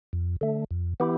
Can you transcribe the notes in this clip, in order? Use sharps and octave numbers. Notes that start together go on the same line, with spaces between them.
F2
D3 A3
F2
E3 B3 E4 G4